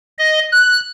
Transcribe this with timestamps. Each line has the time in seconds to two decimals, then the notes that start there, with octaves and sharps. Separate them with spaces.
0.18 D#5
0.52 F#6